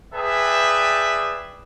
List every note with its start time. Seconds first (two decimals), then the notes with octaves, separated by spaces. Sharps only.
0.13 G#4 B4 D5 E5 G5 A5